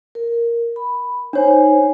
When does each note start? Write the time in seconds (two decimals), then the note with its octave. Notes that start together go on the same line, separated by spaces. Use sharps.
0.15 A#4
0.76 B5
1.33 D4 D#4 C5 C#5 G#5